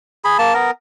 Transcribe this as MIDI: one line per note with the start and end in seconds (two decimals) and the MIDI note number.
0.24 0.37 68
0.24 0.37 83
0.39 0.54 58
0.39 0.54 81
0.54 0.71 59
0.54 0.71 70